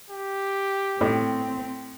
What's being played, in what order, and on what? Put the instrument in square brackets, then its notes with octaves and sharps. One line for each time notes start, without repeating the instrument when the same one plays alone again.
[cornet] G4
[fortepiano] A2 [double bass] C4